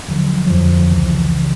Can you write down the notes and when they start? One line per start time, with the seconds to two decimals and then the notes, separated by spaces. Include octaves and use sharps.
0.08 D#2 D3 F3 F#3
0.46 F#3
0.50 F2 D3 F3
0.92 C#2 C#3 E3
1.36 C#3 E3